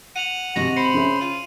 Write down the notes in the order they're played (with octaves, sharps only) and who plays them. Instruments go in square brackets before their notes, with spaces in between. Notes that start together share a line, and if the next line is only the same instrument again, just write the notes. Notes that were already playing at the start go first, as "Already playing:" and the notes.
[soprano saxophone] F#5 [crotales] D#7 F7 F#7
[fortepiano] G#1 C3 [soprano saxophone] F#4 [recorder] A#6
[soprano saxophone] C5 [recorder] B5 [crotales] C#7
[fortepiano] C#3 G#4 E5
[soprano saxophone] F4 [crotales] D#7